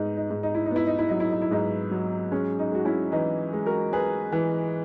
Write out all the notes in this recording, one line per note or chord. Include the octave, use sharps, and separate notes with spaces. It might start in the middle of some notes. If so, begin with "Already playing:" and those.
Already playing: G#2 B3 D#4
D#4
G#2
D#4
E4
B3 D#4
E4
D#4
E4
F#3 D#4
E4
D#4
E4
G#2 D#4
F#3
G#3 C#4
D#4
G#3 F#4
C#4 E4
E3 D#4
G#3
F#4 A#4
G#3 G#4 B4
E3